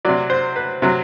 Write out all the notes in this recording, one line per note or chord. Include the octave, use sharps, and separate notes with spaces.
C3 F#3 D5
C5
B4
C3 F#3